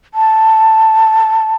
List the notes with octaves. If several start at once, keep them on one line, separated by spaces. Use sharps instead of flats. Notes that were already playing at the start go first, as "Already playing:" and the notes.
A5